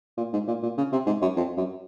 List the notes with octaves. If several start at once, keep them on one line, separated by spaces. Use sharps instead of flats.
A#2
G#2
A#2
A#2
C#3
C3
G#2
F#2
F2
F#2